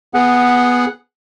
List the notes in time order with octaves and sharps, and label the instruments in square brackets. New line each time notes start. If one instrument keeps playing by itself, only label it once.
[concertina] B3 G#4 F#5